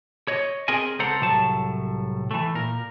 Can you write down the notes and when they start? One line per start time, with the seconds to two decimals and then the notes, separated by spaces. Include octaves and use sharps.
0.28 C#5 D#5
0.68 C4 G#4 A#4 D#5 G#5
0.99 C#2 C4 A4 C5 F#5 A#5
1.21 C2 A2 F#3 A3 A5
2.31 E3 A3
2.54 A#2 A#4